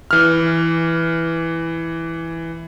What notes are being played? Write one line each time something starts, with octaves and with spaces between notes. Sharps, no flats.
E3 F6